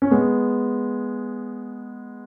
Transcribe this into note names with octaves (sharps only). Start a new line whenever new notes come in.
C#4
G#3 B3